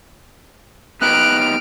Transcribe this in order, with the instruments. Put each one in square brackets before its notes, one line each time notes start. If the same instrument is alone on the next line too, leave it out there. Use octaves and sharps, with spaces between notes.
[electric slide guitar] B3 D#4 G4 [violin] F6 D7 [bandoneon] F#6